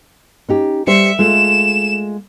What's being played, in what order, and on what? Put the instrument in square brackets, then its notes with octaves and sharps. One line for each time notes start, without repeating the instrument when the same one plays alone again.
[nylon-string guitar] C#4 D#4 G4
[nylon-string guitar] G3 G4 C5 [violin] E5 C#7
[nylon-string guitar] G#3 A3 F4 [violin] E7